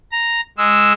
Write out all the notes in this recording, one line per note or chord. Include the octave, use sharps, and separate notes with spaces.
A#5
G#3 E6